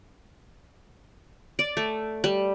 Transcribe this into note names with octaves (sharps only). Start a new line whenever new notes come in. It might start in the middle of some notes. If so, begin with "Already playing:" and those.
D5
A3
G3